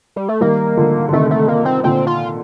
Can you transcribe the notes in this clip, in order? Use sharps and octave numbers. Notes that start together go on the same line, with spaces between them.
G3
A3
D#3 G3 A#3
D3 F3
D3
C3 D#3 A3
A3
A#3
C4
A#2 D3 C4
F4